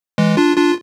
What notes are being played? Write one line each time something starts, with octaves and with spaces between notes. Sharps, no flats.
E3 G#3
D4 F4
D4 F4